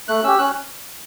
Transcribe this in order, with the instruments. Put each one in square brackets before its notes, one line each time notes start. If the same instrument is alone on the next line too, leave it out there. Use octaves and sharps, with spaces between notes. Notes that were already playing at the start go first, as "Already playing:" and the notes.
[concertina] A3 F#6
C#4 G4 E6
C#4 F#6